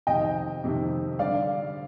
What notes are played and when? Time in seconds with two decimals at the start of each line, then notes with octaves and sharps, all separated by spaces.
0.07 F2 C3 D#3 D#5 G5
0.64 F2 C3 D#3
1.19 G2 D3 D5 F5